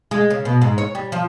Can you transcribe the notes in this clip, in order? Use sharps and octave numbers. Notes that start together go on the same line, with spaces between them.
G#3
C#3
B2
G#2
C#5
G3
F3